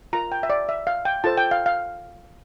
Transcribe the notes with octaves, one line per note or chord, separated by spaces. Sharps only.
F4 A#4 A#5
G5
E5
D5
E5
F5
G5
F4 A4 C5 A5
G5
F5
F5